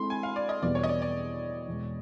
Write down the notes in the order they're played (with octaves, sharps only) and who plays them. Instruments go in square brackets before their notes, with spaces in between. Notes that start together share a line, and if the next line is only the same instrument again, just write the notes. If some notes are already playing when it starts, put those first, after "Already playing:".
Already playing: [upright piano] G#3 C4 E4 A4 [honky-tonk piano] B5 C6
[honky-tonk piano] G#5
F5
D5
D#5
[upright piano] E2 B2 G3 B3 [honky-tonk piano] D5
[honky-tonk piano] C#5
D#5
D5
D5
[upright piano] E2 B2 G#3